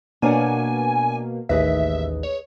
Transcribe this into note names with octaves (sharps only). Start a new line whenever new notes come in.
B2 A#3 D4 C#5 F#5 G#5
A1 D#2 G#4 B4 D#5 E5
C#5